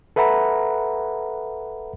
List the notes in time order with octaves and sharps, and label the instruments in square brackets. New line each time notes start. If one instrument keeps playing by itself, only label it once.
[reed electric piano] A4 B4 E5 F#5 A#5 B5